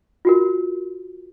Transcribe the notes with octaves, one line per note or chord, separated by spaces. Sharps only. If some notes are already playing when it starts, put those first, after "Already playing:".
F4 F#4 A#4